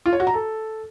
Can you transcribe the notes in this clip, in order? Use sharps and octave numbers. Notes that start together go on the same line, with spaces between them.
F4
C#5
F#4
A#5
A4